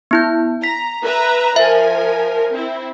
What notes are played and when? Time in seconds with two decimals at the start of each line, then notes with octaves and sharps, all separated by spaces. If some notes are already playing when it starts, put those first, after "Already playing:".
0.11 B3 E4 G6
0.64 A#5 B6
1.04 B4 E5 A#5
1.56 F3 A#4 E5 G#5
2.53 C4 E4